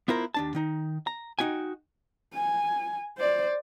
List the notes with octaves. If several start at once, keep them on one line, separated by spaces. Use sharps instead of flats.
B3 E4 F4 A#4 C5
D#2 D4 A5
D#3 D#4
A#5
D#4 F#4 G5 G#5
G#5
C5 D5